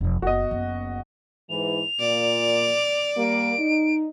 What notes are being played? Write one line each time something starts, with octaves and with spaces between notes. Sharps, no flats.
F1 F3
F#1 B3 F#4 D#5
F#1 B3
G#2 E3 F7
A#2 D5
G3 A#3 D7
D#4